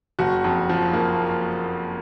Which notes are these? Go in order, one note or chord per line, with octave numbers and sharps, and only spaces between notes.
F#1 F#4
F2
F3
A#3